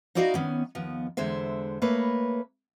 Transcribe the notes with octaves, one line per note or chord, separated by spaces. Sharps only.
D#4 E4 F#4 D5 D#5 F5
D#3 B3 C#4
D#2 F3 B3
E2 D3 G#3 C5 E5
A3 A#3 B4 C#5